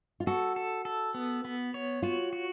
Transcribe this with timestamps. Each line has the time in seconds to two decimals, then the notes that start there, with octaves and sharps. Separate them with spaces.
0.20 F4
0.27 F#4 A4
0.56 A4
0.85 A4
1.14 B3
1.45 B3
1.74 C#5
2.02 F4 F#4
2.33 F#4